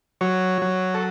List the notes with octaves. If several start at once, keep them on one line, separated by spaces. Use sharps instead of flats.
F#3 C#5
F#3
A4